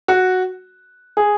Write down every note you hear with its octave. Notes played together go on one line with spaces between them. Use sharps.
F#4
G#4